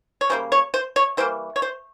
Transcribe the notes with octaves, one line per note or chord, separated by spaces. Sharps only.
C#5
C#3 G3 A#3 C5
C#5
C5
C#5
E3 G3 A#3 C5
C#5
C5